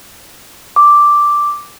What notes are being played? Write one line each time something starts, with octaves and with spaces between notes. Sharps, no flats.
D6